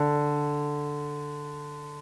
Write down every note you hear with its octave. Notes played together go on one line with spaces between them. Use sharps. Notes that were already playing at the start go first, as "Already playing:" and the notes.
Already playing: D3